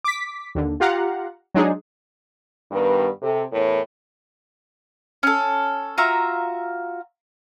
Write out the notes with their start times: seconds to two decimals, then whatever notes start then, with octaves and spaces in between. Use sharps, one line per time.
0.05 D6 B6
0.55 D#2 D3
0.80 F4 G4 F5 F#5 A#5
1.55 F#3 G#3 D4 D#4 G#4
2.72 G2 D#3 G3 B3 B4
3.22 C3 A4
3.52 E2 A2 A#4 C#5
5.23 C#4 A4
5.98 F4 F#4 E5 A#5